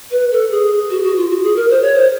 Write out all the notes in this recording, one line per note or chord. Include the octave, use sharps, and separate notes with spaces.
B4
A4
G#4
F#4
F#4
F4
F#4
G#4
A#4
C5
C#5
C5